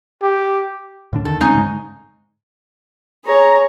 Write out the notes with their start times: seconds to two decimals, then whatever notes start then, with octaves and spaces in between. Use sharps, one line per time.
0.22 G4
1.13 A2 D3 D4
1.25 D#2 D3 D#3 A4
1.41 C#3 G#3 C4 C#4 D#4 G#5
1.55 G#2 D3 G#3
3.26 G#4 C#5 A#5